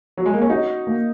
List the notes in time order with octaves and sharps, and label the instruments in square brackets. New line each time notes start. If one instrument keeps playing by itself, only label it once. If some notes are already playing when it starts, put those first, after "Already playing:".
[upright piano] F#3
G#3
A#3
C#4
[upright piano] D#4 [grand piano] F#4
[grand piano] A#3